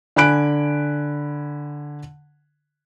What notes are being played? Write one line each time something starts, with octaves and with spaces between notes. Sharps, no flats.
D3 G#5 B5 F#6 D7